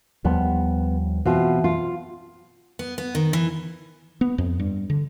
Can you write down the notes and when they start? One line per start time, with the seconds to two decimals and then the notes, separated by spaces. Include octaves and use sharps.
0.25 D#2 F3 G3 B3
1.26 B2 E3 C4 F4
1.64 F4
2.79 B3
2.98 B3
3.15 D#3
3.33 E3
4.21 B3
4.38 F2
4.60 G2
4.90 D3